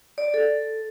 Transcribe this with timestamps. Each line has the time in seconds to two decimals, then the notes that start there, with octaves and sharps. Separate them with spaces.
0.18 D5
0.34 A4